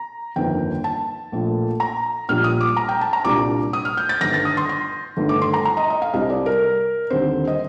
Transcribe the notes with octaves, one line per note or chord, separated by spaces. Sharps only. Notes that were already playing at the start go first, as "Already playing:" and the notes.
Already playing: A#5
G1 F2 D#3 A#3 G5
A5
A#1 A#2 A3
A#5
A#1 A#2 G3 A#3 F6
D#6
D6
A#5
G5
A5
A#5
C2 A#2 G3 D4 D6
D#6
F6
G6
A6
G1 G2 D#3 A#6
A6
D#6
C6
C6
G1 G2 D#3 A3
D6
C6
A#5
A#5
D#5
D#5
F5
C2 C3 G3 D#5
D5
A#4
D#2 D3 G3 C4 C5
D#5